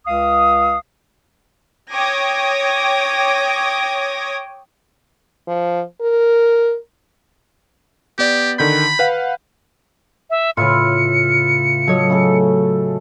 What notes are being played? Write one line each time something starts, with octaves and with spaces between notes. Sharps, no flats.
C#2 F5 D#6
C#5 G5 D6 D#6 G#6 A#6
F3
A#4
B3 G4 D5
D3 D#3 B5 G6
B4 F5 F#5
E5
A2 C#3 F4 B4 E5 C#7
F#3 A4 C#5 D#5
C#3 A3 A4